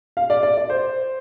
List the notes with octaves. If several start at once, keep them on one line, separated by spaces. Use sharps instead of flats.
F5
D5
D5
D5
C5